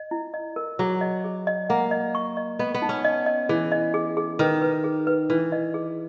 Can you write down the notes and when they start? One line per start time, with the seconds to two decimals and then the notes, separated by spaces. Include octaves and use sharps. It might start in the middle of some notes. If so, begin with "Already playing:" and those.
Already playing: D#5
0.11 E4
0.34 D#5
0.56 A#4
0.79 F#3 G#4
1.01 D#5
1.24 G#4
1.47 D#5
1.69 A#3 F#5
1.91 D#5
2.15 C#6
2.37 D#5
2.59 B3 D#5
2.74 B3
2.82 D#4
2.89 C#4
3.04 D#5
3.26 D#5
3.49 E3 G#4
3.72 D#5
3.94 G#4
4.17 G#4
4.39 D#3 B4
4.62 B4
4.84 G#4
5.07 B4
5.30 E3 B4
5.52 D#5
5.74 G#4